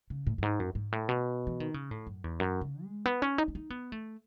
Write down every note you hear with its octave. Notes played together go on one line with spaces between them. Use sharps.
C#3
A2
F#2
G#2
F#2
G#2
A2
B2
E3
D#3
C#3
A2
F#2
E2
F#2
C#3
G#3
B3
C#4
D#4
C#4
D#4
B3
A3